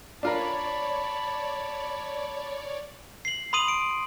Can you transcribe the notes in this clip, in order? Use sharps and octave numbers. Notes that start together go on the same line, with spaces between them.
D4 F4 A#4 C#5 D5 A5 B5
C7 F#7
B5 C6 D#6 D#7 F#7
D7